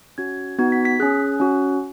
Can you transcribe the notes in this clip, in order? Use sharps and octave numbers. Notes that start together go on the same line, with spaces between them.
C#4 F#4 G#6
B3 D#4 F#4 G#6
B6
B6
C#4 G#4 F#6
C#4 F#4